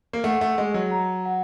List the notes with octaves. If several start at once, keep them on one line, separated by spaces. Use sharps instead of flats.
A#3
A3 F#5
A3
G#3 G#4
F#3
A#5
F#5